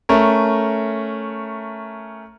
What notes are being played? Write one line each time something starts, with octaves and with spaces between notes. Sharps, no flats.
A3 C#4 A#4